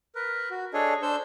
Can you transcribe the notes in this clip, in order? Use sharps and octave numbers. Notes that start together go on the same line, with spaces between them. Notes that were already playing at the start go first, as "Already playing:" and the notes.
A#4 B4
F#4
D4 G#4 A4 C#5 D#5
D4 C5 E6 G6